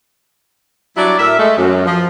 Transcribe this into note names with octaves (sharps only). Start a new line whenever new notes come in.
F#3 G3 D4 E4 D5
A2 A#4 E5
G#3 A3
F#2
F3